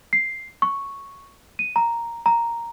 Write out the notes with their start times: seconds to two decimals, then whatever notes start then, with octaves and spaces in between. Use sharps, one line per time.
0.13 C7
0.62 C#6
1.59 D#7
1.76 A#5
2.26 A#5